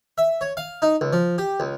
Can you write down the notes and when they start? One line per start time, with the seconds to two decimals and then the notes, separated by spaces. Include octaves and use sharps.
0.18 E5
0.41 C#5
0.57 F5
0.82 D#4
1.01 C#2
1.13 F3
1.38 G4
1.60 C#2